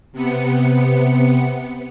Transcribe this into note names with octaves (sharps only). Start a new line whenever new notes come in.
C3 B3 C#7